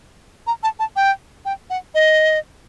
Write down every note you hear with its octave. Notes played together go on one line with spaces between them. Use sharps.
A#5
A5
A5
G5
G5
F#5
D#5